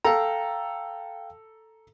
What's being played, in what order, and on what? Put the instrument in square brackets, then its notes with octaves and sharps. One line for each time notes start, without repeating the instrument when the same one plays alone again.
[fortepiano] A4 A#5 [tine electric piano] F5 G5